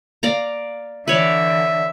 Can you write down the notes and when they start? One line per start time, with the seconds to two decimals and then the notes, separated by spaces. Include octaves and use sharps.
0.23 D5 F5 A#5
1.08 D3 E3 B4 C#5 D5 E5